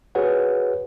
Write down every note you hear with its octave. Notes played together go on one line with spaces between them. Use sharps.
F#4 G#4 B4 C#5 F#5